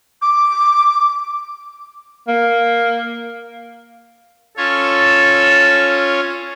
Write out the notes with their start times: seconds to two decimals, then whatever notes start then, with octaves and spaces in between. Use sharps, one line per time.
0.22 D6
2.28 A#3
4.57 C#4 F4 A4 C#5